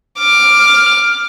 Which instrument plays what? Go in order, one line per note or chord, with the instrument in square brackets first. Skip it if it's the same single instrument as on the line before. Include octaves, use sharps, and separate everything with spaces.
[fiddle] D6 F6